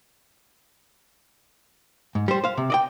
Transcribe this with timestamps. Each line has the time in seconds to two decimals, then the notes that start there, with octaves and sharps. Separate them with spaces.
2.15 G#2
2.28 G3 C5
2.44 C5 F5
2.57 C3
2.70 D5 D#5 G5